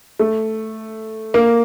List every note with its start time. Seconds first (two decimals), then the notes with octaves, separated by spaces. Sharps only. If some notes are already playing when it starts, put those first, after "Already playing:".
0.19 A3
1.34 A#3